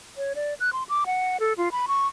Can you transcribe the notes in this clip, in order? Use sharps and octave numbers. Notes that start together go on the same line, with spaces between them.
C#5
D5
F#6
C6
D6
F#5
A4
F4
B5
C#6